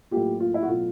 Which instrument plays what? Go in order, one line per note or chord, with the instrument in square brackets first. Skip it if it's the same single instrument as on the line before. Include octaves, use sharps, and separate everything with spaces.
[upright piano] A2 F#3 A#3 F4 G4
F4
E4
F#4
B2 F#3 A3 F4